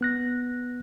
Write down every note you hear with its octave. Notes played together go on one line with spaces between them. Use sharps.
B3 F#6 A#6